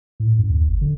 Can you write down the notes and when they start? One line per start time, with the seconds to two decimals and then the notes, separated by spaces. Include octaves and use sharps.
0.20 A2
0.38 F#2
0.50 D#2
0.68 F#1
0.81 D3